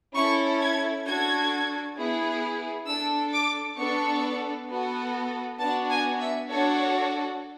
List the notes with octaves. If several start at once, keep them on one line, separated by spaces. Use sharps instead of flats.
C#4 E4 A4 C#6
G#6
D4 F#4 A4 G#6
B3 E4 G#4
D4 A4 E6
D6
B3 D4 A4 C#6
B3 F#4 A4
B3 D4 F#4 A5
G#5
E5
D4 F#4 A4 C#5